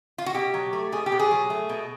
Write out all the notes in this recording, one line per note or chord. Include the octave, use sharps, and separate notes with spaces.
F4
F#4
B2 G4
F#3
A3
B2 G#4
G4
B2
G#4
F#3
A3
B2